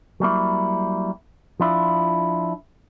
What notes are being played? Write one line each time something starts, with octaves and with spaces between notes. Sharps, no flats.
F#3 G3 A#3 E4
F3 D4 E4 F4